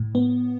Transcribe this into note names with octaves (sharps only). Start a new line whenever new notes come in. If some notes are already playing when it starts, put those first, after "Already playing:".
Already playing: A2
B3